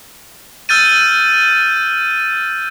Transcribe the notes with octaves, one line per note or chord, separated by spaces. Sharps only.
E6 F6 G6 A6 D#7